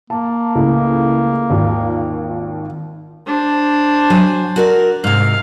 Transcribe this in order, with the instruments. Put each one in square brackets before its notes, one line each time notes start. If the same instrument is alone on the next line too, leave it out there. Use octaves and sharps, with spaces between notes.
[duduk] A#3 [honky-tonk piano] A5
[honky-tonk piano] C#2 A2
G#1 D#2 F4
[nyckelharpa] D4 C5
[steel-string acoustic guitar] F#3 G#5
F#4 A#4 D5
[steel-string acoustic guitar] G#2 C3 [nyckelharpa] F5